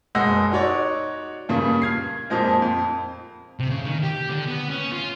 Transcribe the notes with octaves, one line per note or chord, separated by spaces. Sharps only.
F#1 B1 G#3 F#5 E6 A#6
D#4 F#4 C#5 D5
G2 A#2 C#3
F6 G#6 C7
F2 A#2 F3 G#3
F2
C3
C#3
D#3
G4
D3
B3
C#4
F4